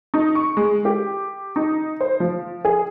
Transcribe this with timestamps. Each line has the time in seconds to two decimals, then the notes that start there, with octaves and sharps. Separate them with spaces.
0.14 D#4
0.35 C#6
0.57 G#3
0.85 G4
1.56 D#4
2.01 C5
2.20 F3
2.65 G#4